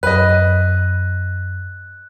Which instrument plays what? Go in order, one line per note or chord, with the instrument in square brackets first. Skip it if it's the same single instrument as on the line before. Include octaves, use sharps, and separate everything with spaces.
[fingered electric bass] F#2 [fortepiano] B4 D#5 [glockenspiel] F#6